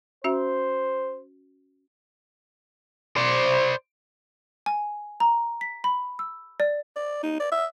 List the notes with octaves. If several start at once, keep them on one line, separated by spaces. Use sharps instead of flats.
C#4 F#4 C5 E5
C5 D5
G#5
A#5
B6
B5
E6
D5
D5
D#4
D5
E5